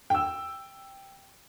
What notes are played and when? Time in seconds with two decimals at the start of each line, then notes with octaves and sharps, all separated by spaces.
0.10 G5 E6